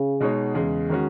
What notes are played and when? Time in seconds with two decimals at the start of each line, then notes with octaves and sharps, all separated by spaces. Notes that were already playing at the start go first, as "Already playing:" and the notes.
Already playing: C#3
0.20 B2 G#3 D#4 F#4 C#5
0.55 E2 C#3 G#3
0.89 D#3 G#3 C#4 F#4